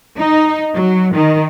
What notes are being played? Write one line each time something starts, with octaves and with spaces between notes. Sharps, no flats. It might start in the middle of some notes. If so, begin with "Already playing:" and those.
D#4
F#3
D#3